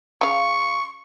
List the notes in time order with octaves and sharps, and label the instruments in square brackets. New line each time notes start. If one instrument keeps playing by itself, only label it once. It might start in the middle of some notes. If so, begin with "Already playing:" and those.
[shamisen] C#3 F5 [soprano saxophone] C#6